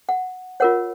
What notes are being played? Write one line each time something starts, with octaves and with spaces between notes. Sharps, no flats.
F#5
F4 A#4 C#5 F#5